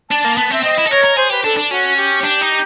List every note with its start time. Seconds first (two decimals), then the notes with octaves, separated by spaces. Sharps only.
0.10 D4 A5
0.24 A#3
0.37 B3 A5
0.50 C4 E5
0.63 C4 D#5
0.78 E4
0.86 A4
0.91 A#4 C#5
1.04 A#4
1.17 G#4 C5
1.30 G4 B4
1.44 D4 A4
1.57 D4
1.70 C#4 F#4
1.97 G4
2.24 D4
2.41 D#4